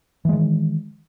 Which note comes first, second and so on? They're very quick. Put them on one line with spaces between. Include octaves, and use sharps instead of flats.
E3 G#3 D#3